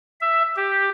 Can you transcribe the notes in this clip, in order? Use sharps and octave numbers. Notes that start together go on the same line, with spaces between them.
E5
G4